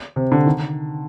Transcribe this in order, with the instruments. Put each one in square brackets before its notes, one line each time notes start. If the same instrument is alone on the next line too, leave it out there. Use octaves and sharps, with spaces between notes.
[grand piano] C3
D3
D#3